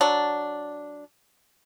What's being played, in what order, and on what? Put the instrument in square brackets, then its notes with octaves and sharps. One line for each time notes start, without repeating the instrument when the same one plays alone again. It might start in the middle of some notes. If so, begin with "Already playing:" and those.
[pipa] F#3 D4